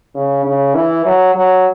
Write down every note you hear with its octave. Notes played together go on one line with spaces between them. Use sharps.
C#3
C#3
E3
F#3
F#3